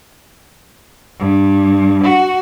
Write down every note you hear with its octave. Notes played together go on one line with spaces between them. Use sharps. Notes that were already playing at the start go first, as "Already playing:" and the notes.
G2
F#4